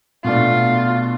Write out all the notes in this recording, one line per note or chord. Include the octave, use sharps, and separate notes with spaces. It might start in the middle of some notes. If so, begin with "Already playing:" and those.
B2 A3 D4 F4